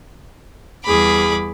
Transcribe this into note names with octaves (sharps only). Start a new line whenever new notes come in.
E2 G3 G#4 B5 D6